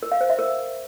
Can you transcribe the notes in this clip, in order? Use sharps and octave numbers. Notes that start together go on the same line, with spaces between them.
A#4
F5
C5
E5
A#4